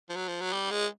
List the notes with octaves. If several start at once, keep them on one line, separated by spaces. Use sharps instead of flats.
F3
F#3
F3
F#3
G3
G#3